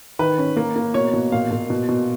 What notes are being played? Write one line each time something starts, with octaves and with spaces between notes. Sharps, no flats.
D#3 B4
C#4
A#3
A#3
B2 C#5
B2
A#2 F5
A#2
B2
B2